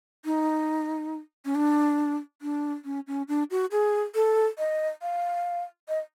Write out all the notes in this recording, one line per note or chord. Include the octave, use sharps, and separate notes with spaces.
D#4
C#4
D4
D4
C#4
C#4
D4
F#4
G#4
A4
D#5
F5
D#5